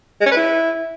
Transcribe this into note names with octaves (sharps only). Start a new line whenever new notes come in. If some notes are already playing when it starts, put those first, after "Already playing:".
G#3
C#4
B4
E4